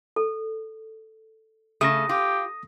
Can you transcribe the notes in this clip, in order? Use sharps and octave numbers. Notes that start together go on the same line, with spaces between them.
A4
C#3 A3 D#6 A#6
F4 G4